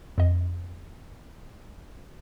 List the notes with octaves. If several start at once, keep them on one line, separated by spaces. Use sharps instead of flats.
F2 D#5